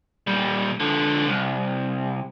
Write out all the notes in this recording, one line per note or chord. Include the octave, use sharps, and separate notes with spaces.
A#2 G3
D3 F3
C2